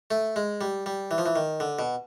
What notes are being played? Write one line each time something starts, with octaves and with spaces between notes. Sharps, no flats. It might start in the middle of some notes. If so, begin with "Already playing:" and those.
A3
G#3
G3
G3
E3
F3
E3
D#3
D3
B2